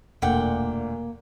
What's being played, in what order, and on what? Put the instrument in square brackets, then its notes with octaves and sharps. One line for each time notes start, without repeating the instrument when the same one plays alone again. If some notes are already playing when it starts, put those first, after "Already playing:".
[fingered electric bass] E1 [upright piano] D2 A#2 [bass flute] A#3 [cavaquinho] D5 F#5 G5